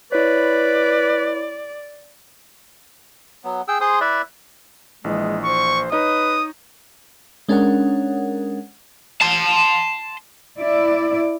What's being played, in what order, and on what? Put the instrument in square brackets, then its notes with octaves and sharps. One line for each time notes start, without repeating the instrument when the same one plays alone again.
[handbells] E4 C#5 [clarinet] B4 [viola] D5
[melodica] F#3 B3
G#4 G5 E6
G#4 C5 C6 D#6
E4 B4 D5 E5
[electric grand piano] A#1 E3 [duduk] G#3
[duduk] C5 [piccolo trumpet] C#6
[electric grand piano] D#4 C#5 D#5 [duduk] B4 [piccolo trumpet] D#6
[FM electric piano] G#3 C#4 D4 A#4 C#5 F#5
[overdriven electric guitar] A5 C6
[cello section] E4 D5